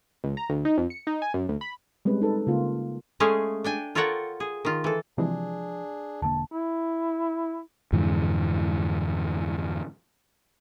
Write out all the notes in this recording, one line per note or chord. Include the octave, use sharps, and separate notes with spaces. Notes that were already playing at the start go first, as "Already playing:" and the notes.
C#2
A#5
D2
D#4
F2
C#7
D#4
G#5
F#2
D2
B5
G3 G#3 C4 C#4 B4
D#4 A4 B4
C#3 A#3 F4
G#3 A3 C#4 G#4 F5
D4 G5 G#5
F4 A4 A#4 C#5 F#5 G5
G#4
D#3 F4
E3 A4
C3 E3 F3 G#3 D4 G#4
E1 D3 A#3 A5
E4
F2 G#2 D3 E3